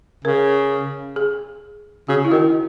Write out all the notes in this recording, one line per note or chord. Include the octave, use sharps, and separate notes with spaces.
C#3 A#4
G#4
C#3 F#4
E4
D#3 F#4